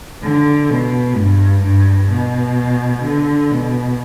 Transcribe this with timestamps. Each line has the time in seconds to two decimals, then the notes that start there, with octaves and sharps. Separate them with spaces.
0.23 D3
0.70 B2
1.16 G2
1.63 G2
2.11 B2
3.04 D3
3.51 B2